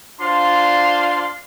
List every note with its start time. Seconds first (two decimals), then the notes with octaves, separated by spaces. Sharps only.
0.21 D4 F4 C5 D5 F5 C6